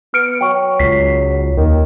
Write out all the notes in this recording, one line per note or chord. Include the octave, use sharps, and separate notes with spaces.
B3 F6 C#7 D7
F#3 G5 C#6
C#2 B6 C7
C#5
D#2 D#3